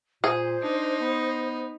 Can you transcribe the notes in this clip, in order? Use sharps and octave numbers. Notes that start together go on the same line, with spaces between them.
A#2 G#4 C5
D4 D#4
B3